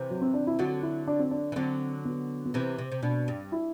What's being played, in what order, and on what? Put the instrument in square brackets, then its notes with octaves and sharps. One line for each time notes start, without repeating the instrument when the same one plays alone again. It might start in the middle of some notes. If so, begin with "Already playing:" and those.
Already playing: [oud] C3 E3
[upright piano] F#3
C4
D4
E4
[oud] D3 F#3 [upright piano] F#4
[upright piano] E4
D4
C4
D4
[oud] E3
[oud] D3 F#3 [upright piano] C4
[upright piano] B3
B3
[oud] C3 E3 [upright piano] C4
[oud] C3
C3
[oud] B2 [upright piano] D4
[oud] G2
[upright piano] E4